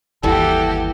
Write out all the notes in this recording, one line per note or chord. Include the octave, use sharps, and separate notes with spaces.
G1 D#2 E3 G3 F#4 G4 A4